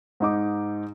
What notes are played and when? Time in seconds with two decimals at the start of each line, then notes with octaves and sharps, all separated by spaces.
0.20 G#2 D#4 D6